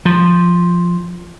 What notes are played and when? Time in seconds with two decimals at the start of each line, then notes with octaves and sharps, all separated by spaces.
0.05 F3